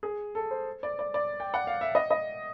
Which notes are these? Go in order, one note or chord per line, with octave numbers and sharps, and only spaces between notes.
G#4
A4
C5
D5
D5
D5
G5
F#5
F5
E5
D#5
D#5